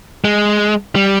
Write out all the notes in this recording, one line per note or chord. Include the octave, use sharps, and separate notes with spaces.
G#3
G3